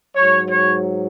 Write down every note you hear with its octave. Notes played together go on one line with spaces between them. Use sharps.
G#2 F#3 C#5
C#5